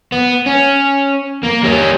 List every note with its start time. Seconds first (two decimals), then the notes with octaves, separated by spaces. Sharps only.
0.12 B3
0.46 C#4
1.43 A#3
1.63 G3 C#4